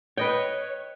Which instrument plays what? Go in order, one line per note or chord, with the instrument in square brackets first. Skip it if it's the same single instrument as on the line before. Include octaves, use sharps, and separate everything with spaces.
[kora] B4 D#5 G5 [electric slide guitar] C#5